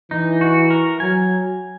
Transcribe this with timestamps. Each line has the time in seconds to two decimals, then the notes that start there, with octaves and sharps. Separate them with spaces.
0.11 E3 D#4
0.41 F#4
0.70 A#4
1.00 F#3 G#5